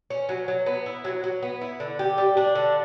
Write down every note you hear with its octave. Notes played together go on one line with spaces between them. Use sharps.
C#4
F#3
F#3
B3
E4
F#3
F#3
B3
E4
D3
G4
G3
D4
D3